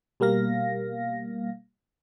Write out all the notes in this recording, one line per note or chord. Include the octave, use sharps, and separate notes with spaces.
B2 G3 A#3 F5 A#6